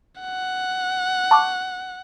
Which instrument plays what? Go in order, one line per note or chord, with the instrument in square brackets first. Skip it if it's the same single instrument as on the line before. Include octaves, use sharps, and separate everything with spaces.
[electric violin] F#5
[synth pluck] A5 C#6 D6